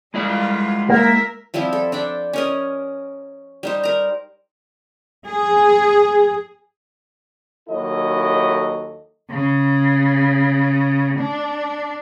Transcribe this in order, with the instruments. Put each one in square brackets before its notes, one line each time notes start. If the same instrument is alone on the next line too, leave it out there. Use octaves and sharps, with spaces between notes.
[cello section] G3 F4 [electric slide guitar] G#3 E4 D5
[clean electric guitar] A#3 [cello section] A#4 E5
[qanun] F3 G3 C4 E4
A4
D4 D5 G5
C#4 A#4 D#5
G3 D#4 C5
A#4 A#5
[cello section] G#4
[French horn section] D#2 F#3 E4 A4 D#5
[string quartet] C#3
D4